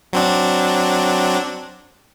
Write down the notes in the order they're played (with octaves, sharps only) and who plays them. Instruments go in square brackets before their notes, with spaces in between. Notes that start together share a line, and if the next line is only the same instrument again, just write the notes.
[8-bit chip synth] F#3 C4 D4